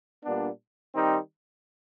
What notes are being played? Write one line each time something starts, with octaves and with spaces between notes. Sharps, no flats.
A#2 G3 B3 D4
D#3 G3 C4 D#4